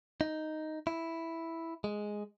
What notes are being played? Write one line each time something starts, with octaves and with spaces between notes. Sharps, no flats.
D#4
E4
G#3